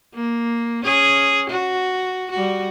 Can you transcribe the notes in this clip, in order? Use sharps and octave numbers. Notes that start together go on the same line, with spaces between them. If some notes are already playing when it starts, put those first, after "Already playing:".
A#3
C#4 G#4
F#4
G3 F#4